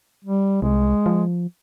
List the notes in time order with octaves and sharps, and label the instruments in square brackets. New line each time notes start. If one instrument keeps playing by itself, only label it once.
[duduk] G3
[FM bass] C2 [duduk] G#3
[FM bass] F3